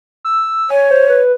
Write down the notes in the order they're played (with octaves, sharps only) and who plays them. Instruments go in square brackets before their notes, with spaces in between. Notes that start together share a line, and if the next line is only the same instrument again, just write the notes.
[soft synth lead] E6
[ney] C#5 [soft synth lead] G#5
[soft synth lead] C5
B4